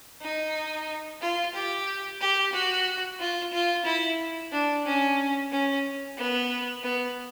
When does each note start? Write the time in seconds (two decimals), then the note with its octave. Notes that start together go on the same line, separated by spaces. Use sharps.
0.21 D#4
1.21 F4
1.55 G4
2.21 G4
2.53 F#4
3.19 F4
3.53 F4
3.85 E4
4.52 D4
4.85 C#4
5.51 C#4
6.18 B3
6.83 B3